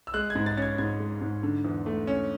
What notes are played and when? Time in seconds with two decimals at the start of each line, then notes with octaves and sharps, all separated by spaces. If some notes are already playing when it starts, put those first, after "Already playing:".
0.07 E6
0.14 G#3 F#6
0.30 G#6
0.35 G#2
0.46 A6
0.57 C#4 A6
0.62 G#6
0.78 G#2 G#6
1.00 G#3
1.21 G#2
1.43 D3
1.65 E2
1.86 A3
2.07 C#4